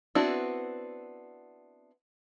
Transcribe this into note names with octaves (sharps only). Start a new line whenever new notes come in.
B3 C4 D4 E4 F#4